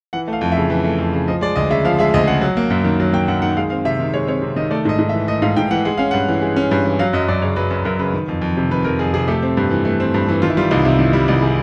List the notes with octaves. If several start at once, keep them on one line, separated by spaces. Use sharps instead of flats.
E3 F#5
A3
F5
F2
C#3 E5
E3
A3
F2
C#3
F3 D#5
G#3 D5
D2 D#5
C#3 E5
F3 F5
G#3 E5
D2 D#5
C#3 F#5
F#3
A#3
F#2
D#3
F#3
A#3 G5
F#2 F#5
D#3 F#5
G#3 F5
C4 F5
C3 E5
D#3
G#3 C#5
C4 C#5
C3
D#3 D#5
A3 D5
G#2 D#5
G#2
E5
E3
A3 D#5
G#2 F5
G#2 G5
E3 F#5
G#3 F#5
C#4 F5
G2 F#5
E3
G#3
C#4
G2
E3
F#3 F5
F#2 D#5
F#2 D5
C#3 C#5
F#3 B4
F#2 B4
F#2 A#4
C#3 B4
D#3
F2
F2
C3
D#3 B4
F2 A#4
F2 G#4
C3 G#4
A3 G4
C4
G2
E3
A3
C4
G2
E3
D#3 F4
E4
G3 F4
C2 D#4
C3 E4
D#3 D#4
G3 E4
C2 D#4
C3 G#4